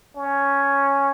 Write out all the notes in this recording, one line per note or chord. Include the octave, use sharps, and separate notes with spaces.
C#4